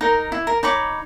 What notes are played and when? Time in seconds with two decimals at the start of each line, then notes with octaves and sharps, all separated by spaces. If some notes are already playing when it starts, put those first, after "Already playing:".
0.01 D#4 A#4
0.32 E4
0.47 A#4
0.63 D#4 C#5 B5 D6